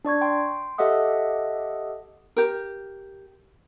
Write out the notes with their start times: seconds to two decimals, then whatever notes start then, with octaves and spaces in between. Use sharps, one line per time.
0.05 D4 D5 C#6 G#6
0.21 G5 C6
0.78 G4 A4 D#5 E5 F#5 D#6
2.36 G4 A#4